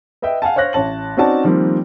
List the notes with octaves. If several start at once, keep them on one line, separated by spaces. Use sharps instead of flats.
B4 D#5 E5 G5
F5 F#5 G#5 A5
C5 C#5 F5 F#6 A#6
A1 C#5 A5 F#7
C4 C#4 D#4 F#4 D5 A5
D#3 F3 G3 A#3 C4